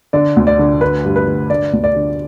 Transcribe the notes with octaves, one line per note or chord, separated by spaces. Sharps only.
D3 D5
D2
D5
D3
D3 B4
G2
B4
D3
D3 D5
D2
D5
D3